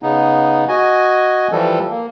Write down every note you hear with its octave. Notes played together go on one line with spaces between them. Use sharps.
C#3 B3 D#4
F#4 D#5 G#5
E3 F3 G3 A4
A#3